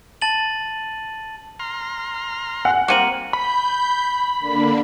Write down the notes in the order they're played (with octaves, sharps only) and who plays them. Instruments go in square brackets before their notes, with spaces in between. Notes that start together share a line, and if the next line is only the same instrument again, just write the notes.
[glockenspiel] A5 A6 D#7 F#7
[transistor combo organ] A#5 C6 F6
[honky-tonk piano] F#5 [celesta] G#5
[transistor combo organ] G3 [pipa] A#3 C4 A#4 [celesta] C#7 D#7 F#7
[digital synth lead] B5 [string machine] G6
[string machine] D3 A#3 D4